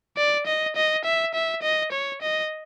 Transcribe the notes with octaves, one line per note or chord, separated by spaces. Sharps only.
D5
D#5
D#5
E5
E5
D#5
C#5
D#5